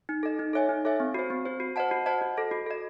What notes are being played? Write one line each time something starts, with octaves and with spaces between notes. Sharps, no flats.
D#4
A4 D#5
D#4
A4 C#5 E5 G#5
D#4
A4 C#5 E5 G#5
C4
F#4 C5
C4
F#4 C5
F#4
C5 D#5 F#5 A5
F#4
C5 D#5 F#5 A5
F#4
A4 D#5
F#4
A4 D#5